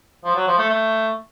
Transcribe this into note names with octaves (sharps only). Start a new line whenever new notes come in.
F3
F#3
F3
A3
A3